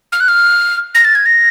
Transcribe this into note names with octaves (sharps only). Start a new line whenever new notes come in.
F6
F#6
F6
A#6
A6
G#6
A#6